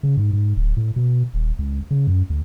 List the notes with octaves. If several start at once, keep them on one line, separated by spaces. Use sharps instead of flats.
C#3
G#2
G#2
D1
A2
B2
D#1
C#2
C#3
F#2
D2